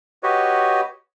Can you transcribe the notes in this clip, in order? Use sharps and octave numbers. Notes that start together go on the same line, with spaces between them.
F#4 G4 B4 C#5 D#5